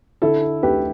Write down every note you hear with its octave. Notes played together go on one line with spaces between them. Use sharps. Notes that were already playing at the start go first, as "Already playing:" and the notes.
D3 E4 A4
D2 G4 B4